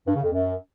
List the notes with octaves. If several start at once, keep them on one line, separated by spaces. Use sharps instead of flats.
G2
C#3
F2
F#2